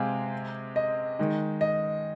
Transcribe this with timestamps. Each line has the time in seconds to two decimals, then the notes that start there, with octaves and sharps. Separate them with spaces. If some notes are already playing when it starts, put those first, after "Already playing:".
Already playing: C3 G#3 C4 D#5 F5 G#5
0.76 D#5
1.19 D#3 G#3 D#4
1.61 D#5